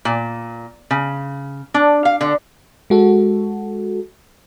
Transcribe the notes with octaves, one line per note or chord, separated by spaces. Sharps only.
A#2
C#3
D4
F5
D3
G#3 F#4 A4